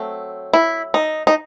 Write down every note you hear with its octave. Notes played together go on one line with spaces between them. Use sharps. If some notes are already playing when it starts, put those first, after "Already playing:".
Already playing: F#3 A3 C4
E4
D#4
D#4